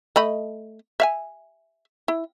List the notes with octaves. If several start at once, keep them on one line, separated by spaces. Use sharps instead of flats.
A3 D#5 B5
E5 F5 G#5
E4